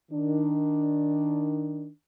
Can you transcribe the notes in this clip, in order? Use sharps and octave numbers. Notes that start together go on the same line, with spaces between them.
D#3 D4